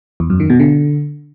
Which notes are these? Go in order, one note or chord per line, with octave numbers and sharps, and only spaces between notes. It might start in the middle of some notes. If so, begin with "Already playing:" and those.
E2
F#2
D#3
B2
D3